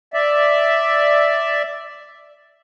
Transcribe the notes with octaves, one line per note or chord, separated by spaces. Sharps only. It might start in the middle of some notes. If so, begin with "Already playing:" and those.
D5 E5